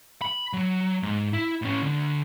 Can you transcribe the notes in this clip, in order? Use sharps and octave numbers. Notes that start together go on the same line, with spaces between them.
B5
F#3
G#2
E4
A2 C#4
D2 D3